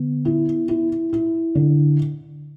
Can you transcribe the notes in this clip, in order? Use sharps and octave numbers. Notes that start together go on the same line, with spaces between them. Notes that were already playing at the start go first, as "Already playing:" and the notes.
Already playing: D3 B3
E4
E4
E4
D3